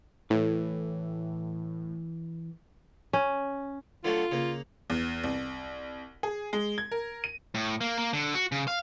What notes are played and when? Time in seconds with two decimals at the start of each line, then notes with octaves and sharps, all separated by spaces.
0.30 A2 E3 B4
3.13 C#4
4.04 D3 F#3 A3 F4
4.32 C#3 A#3
4.90 E2
5.24 C2
6.23 G#4
6.53 G#3
6.78 G#6
6.92 A#4
7.24 D#7
7.55 A2
7.81 A#3
7.98 A#3
8.13 D3
8.35 F#4
8.52 C#3
8.68 F5